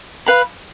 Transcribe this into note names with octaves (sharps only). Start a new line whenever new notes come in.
B4 F5 B5